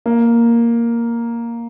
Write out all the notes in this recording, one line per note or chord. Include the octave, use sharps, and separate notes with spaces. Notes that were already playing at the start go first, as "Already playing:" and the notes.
A#3